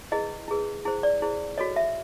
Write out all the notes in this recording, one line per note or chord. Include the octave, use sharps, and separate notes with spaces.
E4 G#4 B4 D#5
E4 G#4 B4
E4 G#4 C5
D5
E4 G#4 C5
F#4 A4 C#5 D#5
E5